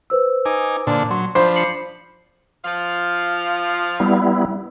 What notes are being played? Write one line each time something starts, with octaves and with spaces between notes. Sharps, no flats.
B4 C5 E6
D#4 G#5 D6
A#2 D3 D4
F#3 C6
F3 D4 C5 B5
C7 C#7 F#7
F3 F5
G3 B3 E4